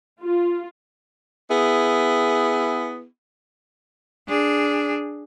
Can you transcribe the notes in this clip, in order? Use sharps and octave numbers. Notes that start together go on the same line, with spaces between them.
F4
B3 E4 G#4
D4 G#4